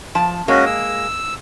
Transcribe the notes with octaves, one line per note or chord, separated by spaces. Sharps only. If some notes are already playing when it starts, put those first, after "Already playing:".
F3 A5
G#3 A#3 C#4 F#4
E6